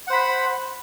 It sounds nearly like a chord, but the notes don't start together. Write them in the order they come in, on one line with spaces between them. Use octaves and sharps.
F#5 C5 B5